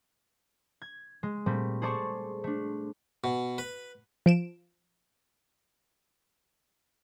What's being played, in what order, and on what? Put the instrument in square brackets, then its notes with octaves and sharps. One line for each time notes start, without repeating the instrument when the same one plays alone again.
[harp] G#6
G#3
A#2 G3 A3 C4
G#4 A4 C5 D5 A5 C#6
A3 D4
[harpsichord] B2
B4
[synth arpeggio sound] F3 D7 E7